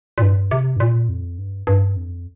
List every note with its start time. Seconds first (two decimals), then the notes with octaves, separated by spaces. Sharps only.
0.18 A#2
0.22 G2
0.51 C3
0.76 G2
0.80 A#2
1.09 F2
1.38 G2
1.67 G2
1.96 F2